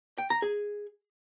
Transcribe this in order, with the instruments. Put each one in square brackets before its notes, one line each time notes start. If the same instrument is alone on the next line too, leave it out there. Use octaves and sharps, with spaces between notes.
[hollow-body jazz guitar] G5
A#5
G#4